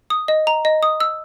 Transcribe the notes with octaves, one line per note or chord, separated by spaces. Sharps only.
D#6
D#5
A#5
D#5
D#6
E6